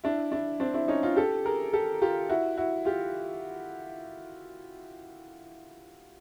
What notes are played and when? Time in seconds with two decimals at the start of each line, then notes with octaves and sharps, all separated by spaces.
0.04 D4 E4
0.32 D4 E4
0.60 C4 D4
0.74 D4 E4
0.88 C#4 D#4
1.03 D#4 F4
1.16 G4 A4
1.45 G#4 A#4
1.73 G4 A4
2.02 F4 G4
2.29 E4 F#4
2.57 E4 F#4
2.85 F4 G4